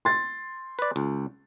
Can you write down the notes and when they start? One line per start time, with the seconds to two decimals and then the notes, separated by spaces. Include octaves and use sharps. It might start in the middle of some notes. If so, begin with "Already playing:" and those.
0.05 C6 A6
0.79 B4 D5
0.96 C#2